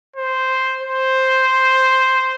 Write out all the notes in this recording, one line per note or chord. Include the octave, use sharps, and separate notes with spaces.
C5
C5